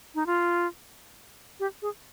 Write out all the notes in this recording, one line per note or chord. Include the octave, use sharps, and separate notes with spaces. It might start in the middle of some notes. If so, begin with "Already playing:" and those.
D#4
F4
G4
G#4